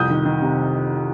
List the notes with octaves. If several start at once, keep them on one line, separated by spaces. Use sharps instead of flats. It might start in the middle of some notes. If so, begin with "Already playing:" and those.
Already playing: C2 F2 D#6 G6
D#3
D#3
C3